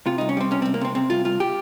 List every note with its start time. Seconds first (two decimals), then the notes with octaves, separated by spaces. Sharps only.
0.06 C3 F4
0.18 C2 D#4
0.29 C#4
0.37 G3 C4
0.51 C3 C#4
0.62 C2 C4
0.74 A#3
0.81 C3 C4
0.95 C3 C4
1.10 C2 F4
1.25 C2 F4
1.40 G4